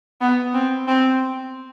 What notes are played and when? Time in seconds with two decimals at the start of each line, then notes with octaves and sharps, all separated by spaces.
0.21 B3
0.54 C4
0.88 C4